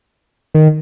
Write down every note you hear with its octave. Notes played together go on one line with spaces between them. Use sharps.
D#3